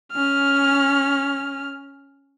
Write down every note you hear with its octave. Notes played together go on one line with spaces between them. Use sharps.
C#4 F6